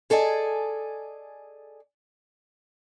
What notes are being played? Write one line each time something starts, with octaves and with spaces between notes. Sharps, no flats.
G#4 A4 D5 D#5 G#5